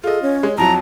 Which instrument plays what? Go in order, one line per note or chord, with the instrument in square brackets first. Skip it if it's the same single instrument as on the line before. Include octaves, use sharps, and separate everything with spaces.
[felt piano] F4 D#5 [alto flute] G#4 [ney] A4
[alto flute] C#4 [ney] C#5
[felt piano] G#3
[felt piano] F2 F#3 [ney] E4 [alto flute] A5 [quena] A#5